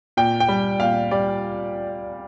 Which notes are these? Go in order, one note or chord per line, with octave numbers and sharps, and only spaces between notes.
A#2 G5
G5
G3
A#2 F5
G3 D5